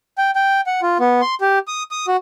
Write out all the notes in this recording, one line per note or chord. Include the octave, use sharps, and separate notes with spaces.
G5
G5
F#5
F4
B3
C6
G4
D#6
D#6
F#4